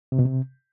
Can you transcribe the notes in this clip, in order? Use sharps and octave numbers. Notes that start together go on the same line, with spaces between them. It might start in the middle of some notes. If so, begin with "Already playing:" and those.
C3
B2
C3